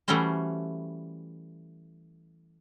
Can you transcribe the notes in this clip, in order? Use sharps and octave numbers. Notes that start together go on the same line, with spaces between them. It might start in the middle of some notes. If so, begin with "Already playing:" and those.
E3 G3 A3 C#4 F#4 C5